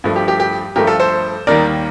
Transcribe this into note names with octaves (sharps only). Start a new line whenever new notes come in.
G2 F3 A3
G4
G4
G4
G2 F3 A3 G4 A#4
F4 A4
A4 C5
D#2 D#3 G3 A#3 A#4 D5